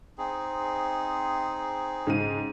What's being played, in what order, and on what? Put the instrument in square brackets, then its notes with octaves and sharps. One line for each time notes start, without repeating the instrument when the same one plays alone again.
[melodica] C4 D#4 G#4
[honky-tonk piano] G#2 C#3 D#7